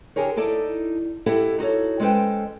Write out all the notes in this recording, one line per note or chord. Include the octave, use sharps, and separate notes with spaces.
D3 G4 G#4 A#4 C#5
D#4 E4 A4 D5
E4 G4 A4 D#5 E5 F#5
D#4 F#4 A4 C#5
G#3 C#4 A4 B4 C5 G5